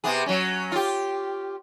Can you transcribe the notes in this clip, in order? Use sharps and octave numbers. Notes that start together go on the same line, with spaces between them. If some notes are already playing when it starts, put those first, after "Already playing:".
C3 B3 G#4
F#3 C#4
F4 G4